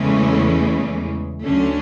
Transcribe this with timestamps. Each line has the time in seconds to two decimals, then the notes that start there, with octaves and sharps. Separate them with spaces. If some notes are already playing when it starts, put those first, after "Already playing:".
Already playing: E2 C#3 E3 G#3 A3 C#4
1.42 D2 D3 F#3 A3 C#4